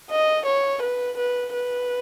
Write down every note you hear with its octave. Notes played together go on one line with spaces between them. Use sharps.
D#5
C#5
B4
B4
B4